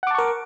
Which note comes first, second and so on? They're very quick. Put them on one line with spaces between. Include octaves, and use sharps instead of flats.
F#5 D6 A5 C#6 A#4